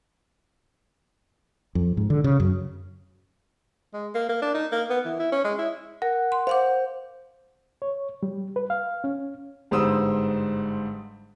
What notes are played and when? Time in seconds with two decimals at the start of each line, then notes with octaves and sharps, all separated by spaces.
1.75 F2
1.97 G#2
2.10 D3
2.24 C#3
2.40 F#2
3.94 G#3
4.15 A#3
4.29 A#3
4.42 D4
4.54 D#4
4.72 A#3
4.90 B3
5.05 E3
5.19 E4
5.32 C#4
5.44 G#3
5.59 E4
6.02 A#4 F#5
6.32 C6
6.47 C5 F5 F#5 D6
7.82 C#5
8.23 G3
8.56 B4
8.70 F5
9.04 C#4
9.71 G1 G#2 G3 C5 D#6 E6